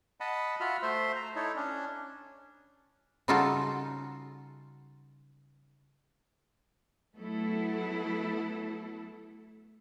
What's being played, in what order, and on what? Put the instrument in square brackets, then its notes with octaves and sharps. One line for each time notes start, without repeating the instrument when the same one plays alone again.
[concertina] D#5 F#5 A5 B5
F4 F#4 E5 F#5 B5 F6
A3 C5 E5 C6
A#5
D#4 E4 A4 C#5
C#4 D4
[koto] C#3 G3 D#4 F4 F#4 A4
[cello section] F#3 A3 B3 E4 A4